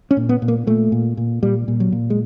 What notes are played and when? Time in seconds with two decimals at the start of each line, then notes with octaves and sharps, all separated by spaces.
0.11 C#4
0.17 A#2
0.29 B3
0.42 A#2
0.48 A#3
0.67 A#2 A3
0.92 A#2
1.17 A#2
1.43 A#2 G3
1.68 A#2
1.80 F#3
1.92 A#2
2.10 G#3